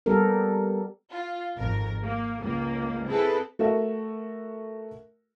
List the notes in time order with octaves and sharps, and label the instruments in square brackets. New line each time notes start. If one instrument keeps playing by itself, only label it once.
[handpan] G3 B3 G4 A4 A#4
[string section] F4
G#1 F2 A#4
A#3
C#2 A#3
C4 E4 G#4 A4 B4
[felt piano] A3 F#4 A4 A#4 E5